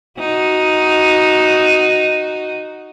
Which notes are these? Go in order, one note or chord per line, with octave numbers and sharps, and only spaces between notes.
D#4 F#4